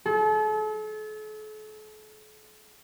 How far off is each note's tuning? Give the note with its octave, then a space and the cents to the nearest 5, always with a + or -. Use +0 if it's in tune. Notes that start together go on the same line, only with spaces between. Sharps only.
A4 -40